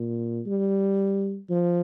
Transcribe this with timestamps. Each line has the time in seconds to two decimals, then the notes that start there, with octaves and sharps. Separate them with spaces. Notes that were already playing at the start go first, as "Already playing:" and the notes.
Already playing: A#2
0.46 G3
1.49 F3